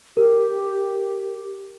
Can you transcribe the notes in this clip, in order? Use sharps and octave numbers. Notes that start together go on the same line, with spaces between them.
G4 A#4